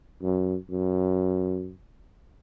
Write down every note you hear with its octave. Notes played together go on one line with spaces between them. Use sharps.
F#2
F#2